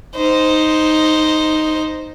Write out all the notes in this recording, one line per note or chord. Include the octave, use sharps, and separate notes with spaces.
D#4 C5